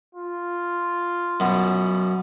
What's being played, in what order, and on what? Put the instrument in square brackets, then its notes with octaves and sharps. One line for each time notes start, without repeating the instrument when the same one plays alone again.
[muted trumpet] F4
[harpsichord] F#2 B2